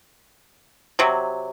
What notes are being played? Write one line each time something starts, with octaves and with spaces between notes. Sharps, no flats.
C3 F#3